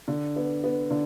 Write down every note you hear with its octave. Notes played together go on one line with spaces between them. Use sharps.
D3
B3
B3
D3